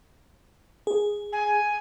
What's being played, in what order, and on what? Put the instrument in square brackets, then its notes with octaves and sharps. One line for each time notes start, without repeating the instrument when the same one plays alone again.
[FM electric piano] G#4
[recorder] G#5